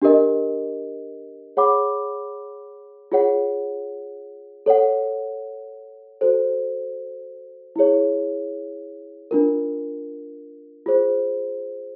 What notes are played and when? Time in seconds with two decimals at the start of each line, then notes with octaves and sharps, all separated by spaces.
0.02 D4 G4 A#4 D#5
1.57 G#4 C#5 F#5 B5 D6
3.12 F4 G#4 C#5 F#5
4.66 A4 C#5 F#5
6.21 F#4 A4 C5
7.76 E4 G#4 C#5
9.31 D4 F4 A#4
10.86 F4 G#4 C5